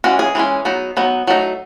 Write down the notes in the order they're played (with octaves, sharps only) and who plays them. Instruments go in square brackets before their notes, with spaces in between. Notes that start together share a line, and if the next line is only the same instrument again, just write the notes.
[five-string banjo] E3 G#3 C#4 F#4
G#4
E3 G#3 C#4
F#3 B3 D#4
F#3 B3 D#4
F#3 A3 D#4